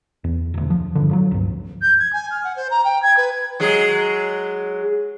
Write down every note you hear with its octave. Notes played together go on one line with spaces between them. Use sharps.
E2
E1 D2
F3
G2 D3
F3 F#3
C#2 G2
G6
G#6
G#5
F6
F#5
C5
A#5
G5
G#6
B4
F#3 G#3 G#4